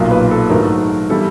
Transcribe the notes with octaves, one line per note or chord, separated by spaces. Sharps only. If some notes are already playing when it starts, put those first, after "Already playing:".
Already playing: B1 A#2 F#3 A#3 D#4
B4
A4
G#2 D#3 F#3 A3 A#4
E3 G3 B3 E4 A4